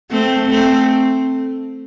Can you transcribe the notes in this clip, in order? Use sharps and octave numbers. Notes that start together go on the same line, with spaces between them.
A3 C4
A3 C4